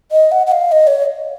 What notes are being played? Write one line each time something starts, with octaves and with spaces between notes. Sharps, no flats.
D#5
F#5
F#5
F5
D#5
C#5